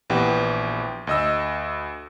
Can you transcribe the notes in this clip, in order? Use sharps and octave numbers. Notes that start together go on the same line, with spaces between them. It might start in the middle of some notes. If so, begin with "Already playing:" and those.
A#1 E3 B3 G4 F#5 G5
D2 D#5 E6